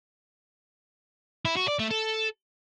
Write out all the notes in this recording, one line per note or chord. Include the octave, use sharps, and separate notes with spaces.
E4
F#4
D5
A3
A4